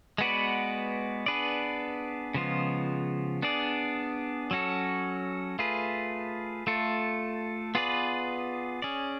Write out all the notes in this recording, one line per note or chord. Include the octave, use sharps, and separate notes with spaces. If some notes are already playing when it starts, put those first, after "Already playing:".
G#3 B3 F#4 B4 D5
B3 D4 G#4 B4 D5
C#3 F3 G#3 B3 F4
B3 D4 G#4 D5
F#3 C#4 F#4 A4
A3 F4 G#4 B4
A3 F4 A4
B3 F4 G#4 B4 D5
C#4 G#4 D5